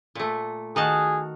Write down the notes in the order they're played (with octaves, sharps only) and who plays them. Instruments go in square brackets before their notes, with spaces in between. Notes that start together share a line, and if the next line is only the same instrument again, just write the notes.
[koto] A#2 A3
[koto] D#3 F#4 A5 [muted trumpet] G#4